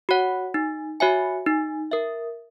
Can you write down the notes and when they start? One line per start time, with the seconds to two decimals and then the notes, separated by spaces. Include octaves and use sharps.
0.09 F#4 C#5 F#5
0.54 D#4
1.00 F#4 C#5 E5 G#5
1.46 D#4
1.92 A#4 E5